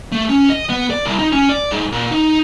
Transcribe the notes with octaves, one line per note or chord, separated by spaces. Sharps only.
A3
C#4
D#5
B3
D5
C2
D#4
C#4
D5
G#2
A#2
D#4